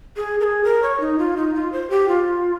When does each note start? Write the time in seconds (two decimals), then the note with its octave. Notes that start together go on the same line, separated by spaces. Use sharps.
0.16 G#4
0.40 A#4
0.44 G#4
0.64 A#4
0.83 C#5
1.00 D#4
1.19 F4
1.37 D#4
1.54 F4
1.72 C5
1.90 G4
2.08 F4